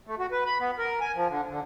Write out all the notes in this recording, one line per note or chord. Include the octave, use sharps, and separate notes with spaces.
A3
F#4
B4
B5
B3
A#4
G#5
F3
D3
D3